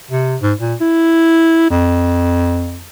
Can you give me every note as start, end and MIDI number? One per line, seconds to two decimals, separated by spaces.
0.11 0.36 48
0.41 0.53 44
0.60 0.74 46
0.81 1.67 64
1.70 2.86 41